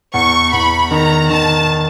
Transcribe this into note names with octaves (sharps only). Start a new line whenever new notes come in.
E2 C#6
E2 B5
D#3 A#5
D#3 A5